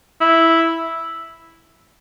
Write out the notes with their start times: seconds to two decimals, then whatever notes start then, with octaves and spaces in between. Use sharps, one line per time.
0.21 E4